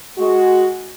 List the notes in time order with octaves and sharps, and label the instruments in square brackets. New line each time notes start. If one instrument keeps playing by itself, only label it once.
[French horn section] G#3 F#4